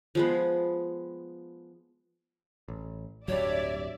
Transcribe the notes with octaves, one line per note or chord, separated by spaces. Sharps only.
F3 G#3 B3
A1
D1 G2 F#3 C#5 D5 E5